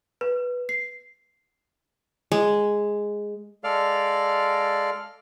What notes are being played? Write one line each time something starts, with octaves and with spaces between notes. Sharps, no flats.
B4
C7
G#3
G#3 A4 D5 F5 F6